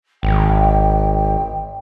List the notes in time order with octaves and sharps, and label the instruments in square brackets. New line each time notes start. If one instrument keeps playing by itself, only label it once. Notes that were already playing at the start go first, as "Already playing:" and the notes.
[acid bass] G#1 [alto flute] G5